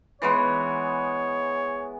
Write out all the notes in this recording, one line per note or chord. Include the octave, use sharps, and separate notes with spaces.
E3 G#3 B3 C#5